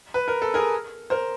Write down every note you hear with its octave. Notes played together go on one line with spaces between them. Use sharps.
B4
A#4
A4
G#4 A#4
A#4 C5